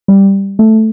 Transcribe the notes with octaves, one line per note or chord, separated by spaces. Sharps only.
G3
A3